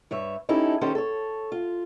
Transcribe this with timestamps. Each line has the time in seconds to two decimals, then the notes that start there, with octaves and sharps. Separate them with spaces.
0.11 G2 C#5 E5
0.49 C#4 D#4 E4 G4 A4
0.81 D#3 C#4 D#4 G4 A4 C5
0.95 A4 C#5
1.52 F4